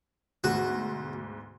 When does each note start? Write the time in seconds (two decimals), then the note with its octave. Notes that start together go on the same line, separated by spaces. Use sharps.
0.44 D2 G#2 B2 F#4